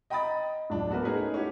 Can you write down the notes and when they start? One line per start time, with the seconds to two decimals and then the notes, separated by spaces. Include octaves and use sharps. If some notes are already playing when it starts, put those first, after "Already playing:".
0.10 D#5 G5 A#5 B5 D#6 A6
0.70 D1 D4
0.90 B3 F#4 A#4 B4
1.05 A3 C#4 D#4 G#4 A#4 B4
1.34 C#4 E4 F#4 G4